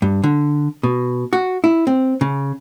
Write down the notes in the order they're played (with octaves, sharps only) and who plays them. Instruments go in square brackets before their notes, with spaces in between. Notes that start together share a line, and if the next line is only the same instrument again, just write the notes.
[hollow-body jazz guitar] G2
D3
B2
F#4
E4
C4
C#3